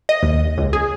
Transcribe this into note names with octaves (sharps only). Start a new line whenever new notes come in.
D#5
D#2
C#2
G#4